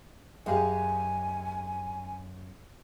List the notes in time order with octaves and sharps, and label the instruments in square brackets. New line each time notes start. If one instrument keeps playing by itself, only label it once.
[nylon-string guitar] F#2 F5 [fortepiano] G#3 G4 G#4 [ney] G#5